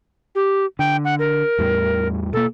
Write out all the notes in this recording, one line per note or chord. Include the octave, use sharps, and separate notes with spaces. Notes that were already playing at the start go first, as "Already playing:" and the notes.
G4
D3 G5
F#5
A#4
E2 A2 G3
B2 A#3 A4